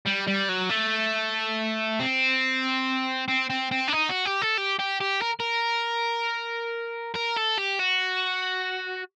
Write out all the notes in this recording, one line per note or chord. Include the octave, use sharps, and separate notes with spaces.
G3
G3
F#3
A3
C4
C4
C4
C4
D4
D#4
F#4
G4
A4
G4
G4
G4
A#4
A#4
A#4
A4
G4
F#4